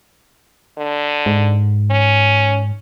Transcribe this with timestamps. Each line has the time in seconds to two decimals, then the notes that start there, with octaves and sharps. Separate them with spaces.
0.78 D3
1.26 G#2
1.91 C#4